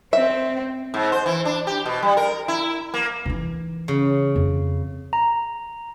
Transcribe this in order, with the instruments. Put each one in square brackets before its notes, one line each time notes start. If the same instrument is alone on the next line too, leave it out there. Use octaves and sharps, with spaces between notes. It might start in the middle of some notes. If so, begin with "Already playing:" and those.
[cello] C4 [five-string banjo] E5
[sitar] G#2
C5
E3
D4
G4
B2
G3
A#4
E4
A#3
[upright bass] E3 D#4
[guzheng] C#3
[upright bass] F2
[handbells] A#5